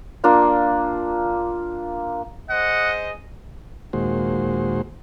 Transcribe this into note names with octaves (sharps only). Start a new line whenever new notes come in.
A#3 D4 F4
G#4 C5 D#5 F#5
D#2 A#2 G#3 F#4 C5